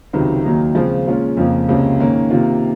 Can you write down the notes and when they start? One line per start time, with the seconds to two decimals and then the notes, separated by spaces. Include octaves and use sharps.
0.13 C#2 C3 D#3 F#3
0.44 D#2 D#3 F#3 A#3 D#4
0.75 C#3 F3 G#3 C4 F4
1.06 A#2 G#3 C#4 F4
1.37 F2 C#3 F3 A#3
1.69 C#2 C3 F3 A#3 C#4
2.00 G#2 D#3 A#3 C#4
2.31 C3 D#3 A#3 F4